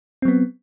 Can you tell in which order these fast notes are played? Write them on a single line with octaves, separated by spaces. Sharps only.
C4 F#3 B3